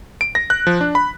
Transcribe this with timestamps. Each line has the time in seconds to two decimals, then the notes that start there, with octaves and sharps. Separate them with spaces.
0.21 D7
0.35 A#6
0.50 F#6
0.67 F3
0.81 D4
0.95 B5